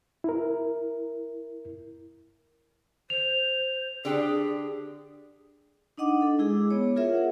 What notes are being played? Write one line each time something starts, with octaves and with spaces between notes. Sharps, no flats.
E4 A#4
C5 F7
D3 D4 G4 G#4
D4 D#4 D#5 F#5 D6
D4 A4
G#3 E4 G#4 D6
B3 C#5
F4 G#4 A#4 C#5 E5
F#5